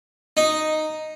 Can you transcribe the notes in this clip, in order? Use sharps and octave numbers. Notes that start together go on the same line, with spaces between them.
D#4